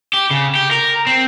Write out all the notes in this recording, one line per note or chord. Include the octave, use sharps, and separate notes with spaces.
G4
C#3
G4
A#4
C4